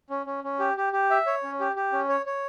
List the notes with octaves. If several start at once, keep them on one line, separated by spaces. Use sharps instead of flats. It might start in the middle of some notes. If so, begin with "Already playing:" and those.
C#4
C#4
C#4
G4
G4
G4
E5
C#5
C#4
G4
G4
C#4
C#5
C#5